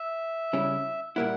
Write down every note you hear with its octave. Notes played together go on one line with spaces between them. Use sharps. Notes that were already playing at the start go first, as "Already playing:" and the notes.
Already playing: E5
C#3 G3 C#4 E4
A#2 G3 A#3 E4 F#5